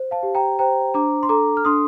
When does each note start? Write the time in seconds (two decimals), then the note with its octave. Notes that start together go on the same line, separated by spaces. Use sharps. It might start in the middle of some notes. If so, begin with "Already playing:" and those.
Already playing: C5
0.11 F5 A5
0.23 G4
0.35 G5 A#5
0.59 C5 G5 A#5
0.94 D4 A#5 D6
1.23 C6
1.29 A4 A#5 D6
1.57 F6
1.65 D4 C6 D#6